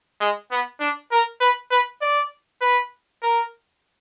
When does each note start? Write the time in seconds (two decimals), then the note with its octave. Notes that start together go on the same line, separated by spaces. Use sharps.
0.21 G#3
0.51 B3
0.80 D4
1.11 A#4
1.40 B4
1.71 B4
2.02 D5
2.61 B4
3.22 A#4